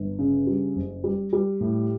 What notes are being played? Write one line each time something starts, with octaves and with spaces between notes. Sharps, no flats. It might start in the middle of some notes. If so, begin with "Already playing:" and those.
Already playing: G1
C#3
G3
F#1
G3
G3
A2